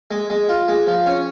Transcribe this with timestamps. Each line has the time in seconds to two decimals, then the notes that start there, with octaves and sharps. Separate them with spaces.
0.11 G#3
0.30 G#3
0.49 F4
0.68 G#3
0.87 F3
1.06 C#4